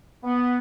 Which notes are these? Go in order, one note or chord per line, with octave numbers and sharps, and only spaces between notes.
B3